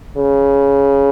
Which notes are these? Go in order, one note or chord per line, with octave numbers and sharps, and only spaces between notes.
C#3